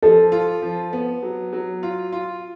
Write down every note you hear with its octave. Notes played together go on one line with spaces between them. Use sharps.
F3 A4
F4
F3
B3
F#3
F#3
F4
F4